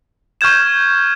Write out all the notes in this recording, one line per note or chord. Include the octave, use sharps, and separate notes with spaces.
C#6 F6 G6 G#6 E7